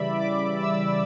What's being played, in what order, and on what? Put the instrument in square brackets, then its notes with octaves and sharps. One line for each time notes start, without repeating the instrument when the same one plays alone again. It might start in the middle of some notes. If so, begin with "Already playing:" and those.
Already playing: [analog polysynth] C#3 E3 G3 D5 E5 B5
D6
E6